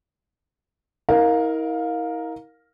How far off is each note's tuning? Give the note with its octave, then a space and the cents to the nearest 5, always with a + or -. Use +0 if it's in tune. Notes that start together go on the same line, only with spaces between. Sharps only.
E4 -45 A#4 +0 F5 +20